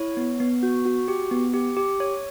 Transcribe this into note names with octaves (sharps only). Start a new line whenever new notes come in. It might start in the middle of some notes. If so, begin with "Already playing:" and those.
Already playing: E4 C#5
B3
B3
F#4
F#4
G4
B3
G4
G4
C#5